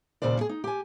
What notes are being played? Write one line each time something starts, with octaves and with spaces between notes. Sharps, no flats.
D#2 A#2 C#3 C5 D5
G3 G#4
D#4
G4 G#5